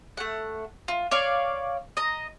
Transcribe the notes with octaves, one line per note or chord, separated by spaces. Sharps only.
A3 F#5
F4
C#5 D5 F5 C#6
D#5 A#5